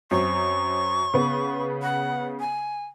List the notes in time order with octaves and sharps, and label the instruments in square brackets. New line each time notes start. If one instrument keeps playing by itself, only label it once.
[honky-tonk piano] F#2 F#3 C4 [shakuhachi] C#6
[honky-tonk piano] C#3 B3
[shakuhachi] F#5
G#5